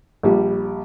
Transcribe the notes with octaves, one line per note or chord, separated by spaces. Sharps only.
A#1 G3